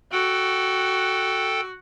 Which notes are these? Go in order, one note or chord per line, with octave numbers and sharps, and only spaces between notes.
F#4 A4 G5